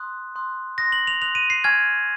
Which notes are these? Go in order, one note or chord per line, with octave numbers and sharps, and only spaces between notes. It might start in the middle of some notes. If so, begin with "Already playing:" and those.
Already playing: C6 D#6 F#6
C6 D#6 F#6
C6 D#6 F#6 A#6
F#7
F7
C6 D#6 F#6 F7
D#7
C7
G#5 C#6 F6 G#6